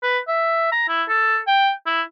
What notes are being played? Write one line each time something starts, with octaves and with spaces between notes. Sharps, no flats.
B4
E5
A#5
E4
A4
G5
E4